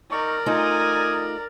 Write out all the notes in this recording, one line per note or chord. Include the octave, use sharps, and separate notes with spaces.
D#4 A#4 D5 C#6
A3 D#4 F4 G#5 D#6